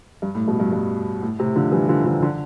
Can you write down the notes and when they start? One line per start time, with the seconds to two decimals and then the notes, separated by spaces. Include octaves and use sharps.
0.22 G2
0.35 A2
0.47 G2 B2
0.60 G2
0.72 G2
1.22 A2
1.39 A2 C3
1.56 D3 F3
1.72 E3 G3
1.88 D3 F3
2.05 D3 F3
2.22 D3 F3